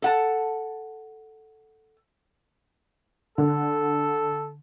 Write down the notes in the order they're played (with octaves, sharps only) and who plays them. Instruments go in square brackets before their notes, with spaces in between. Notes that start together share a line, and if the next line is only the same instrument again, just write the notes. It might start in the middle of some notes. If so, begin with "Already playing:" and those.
[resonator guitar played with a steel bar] A4 F#5 A5
[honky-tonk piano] D3 [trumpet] A4